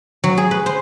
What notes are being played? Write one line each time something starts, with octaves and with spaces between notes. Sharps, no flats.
F#3
G#4
B4
C5